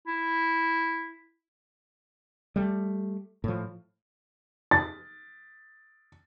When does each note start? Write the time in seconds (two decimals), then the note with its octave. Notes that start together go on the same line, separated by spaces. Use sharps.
0.07 E4
2.56 G3 A3
3.44 A2 F3
4.71 A6